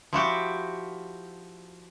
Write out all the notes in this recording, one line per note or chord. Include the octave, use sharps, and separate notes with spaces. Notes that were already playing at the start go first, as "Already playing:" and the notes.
F3 E4 F#4 G4